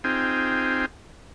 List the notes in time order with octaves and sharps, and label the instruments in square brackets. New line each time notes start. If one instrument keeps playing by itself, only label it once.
[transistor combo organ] C4 D#4 F4 G#4 G5